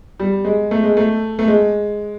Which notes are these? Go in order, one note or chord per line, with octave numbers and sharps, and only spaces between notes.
G3
G#3
A3
G#3
A3
A3
G#3